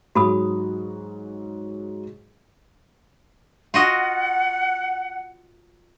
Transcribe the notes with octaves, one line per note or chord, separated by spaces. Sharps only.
G#2 F#3 F#4 G#4 B5 D#6
F4 F#4 D#5 F#5